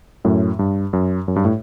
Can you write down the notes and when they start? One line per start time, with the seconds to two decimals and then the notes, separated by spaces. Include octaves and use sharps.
0.25 F#2 A2
0.59 G2
0.93 F#2
1.28 F#2
1.36 G2
1.45 A2